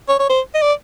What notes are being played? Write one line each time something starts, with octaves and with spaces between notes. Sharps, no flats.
C#5
C#5
C5
D#5
D5